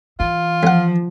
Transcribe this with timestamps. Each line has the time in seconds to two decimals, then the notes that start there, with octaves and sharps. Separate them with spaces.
0.20 E3 F4
0.63 F2 F3 F#5